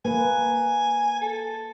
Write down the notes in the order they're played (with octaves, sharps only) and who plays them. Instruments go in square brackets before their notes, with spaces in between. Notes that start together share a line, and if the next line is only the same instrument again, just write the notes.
[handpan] A#3 B4 [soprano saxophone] G#5
[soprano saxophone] A4